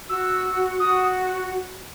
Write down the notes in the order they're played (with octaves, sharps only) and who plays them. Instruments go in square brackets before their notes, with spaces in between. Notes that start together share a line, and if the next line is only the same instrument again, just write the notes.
[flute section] F#4 [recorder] E6
[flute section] F#4 [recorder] D#6